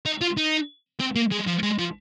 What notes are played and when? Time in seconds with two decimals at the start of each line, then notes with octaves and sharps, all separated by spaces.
0.06 D#4
0.21 F4
0.37 D#4
1.00 C4
1.15 A#3
1.31 G#3
1.47 F3
1.63 G#3
1.79 F3